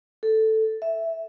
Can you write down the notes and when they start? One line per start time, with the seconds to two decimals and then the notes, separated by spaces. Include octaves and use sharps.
0.23 A4
0.82 E5